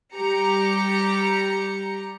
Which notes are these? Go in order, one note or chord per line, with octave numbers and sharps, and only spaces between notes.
G3 G4 A#5 C#7